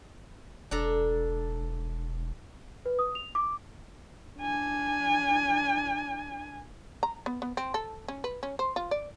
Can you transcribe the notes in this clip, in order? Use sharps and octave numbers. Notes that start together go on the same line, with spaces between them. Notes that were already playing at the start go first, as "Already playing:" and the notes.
E1 D4 A4 A#5
B4
D#6
F7
D6
D4 G#5
A#5
B3
B3
C4
A4
C#4
B4
C#4
C5
F4
D5